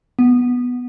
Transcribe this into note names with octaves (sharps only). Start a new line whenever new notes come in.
B3